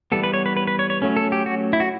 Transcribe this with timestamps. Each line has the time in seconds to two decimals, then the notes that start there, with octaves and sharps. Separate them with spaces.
0.12 E3 G3 B3 A4
0.24 B4
0.34 C#5
0.46 B4
0.57 B4
0.67 B4
0.79 C#5
0.90 C#5
1.02 F#3 A3 C#4
1.17 A4
1.32 G4
1.46 F#4
1.73 E4
1.80 F#4